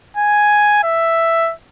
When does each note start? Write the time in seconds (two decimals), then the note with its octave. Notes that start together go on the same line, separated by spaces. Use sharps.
0.17 G#5
0.83 E5